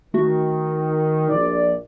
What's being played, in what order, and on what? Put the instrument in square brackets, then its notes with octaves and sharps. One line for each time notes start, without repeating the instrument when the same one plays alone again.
[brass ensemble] D#3 [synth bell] A3 F#4
[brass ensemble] A#1 D5